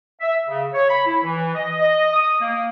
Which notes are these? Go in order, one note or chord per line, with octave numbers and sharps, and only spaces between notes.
E5
C#3
C#5
B5
E4
E3
D#5
D#5
D#6
A#3